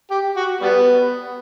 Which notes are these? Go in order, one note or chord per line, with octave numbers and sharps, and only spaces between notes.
G4
F#4
G3 B3